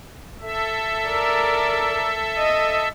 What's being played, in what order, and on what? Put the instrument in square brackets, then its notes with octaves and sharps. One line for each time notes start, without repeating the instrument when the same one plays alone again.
[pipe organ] A4 E5
[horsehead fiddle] A#4 D5
D#5